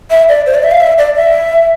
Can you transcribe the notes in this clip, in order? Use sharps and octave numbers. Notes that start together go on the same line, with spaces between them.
E5
D5
C5
D5
E5
F5
E5
D5
E5